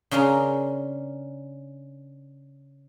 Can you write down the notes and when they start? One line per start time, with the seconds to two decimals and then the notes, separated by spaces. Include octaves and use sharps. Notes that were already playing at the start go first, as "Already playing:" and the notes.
0.11 C#3 C#4 D4 A#4 C6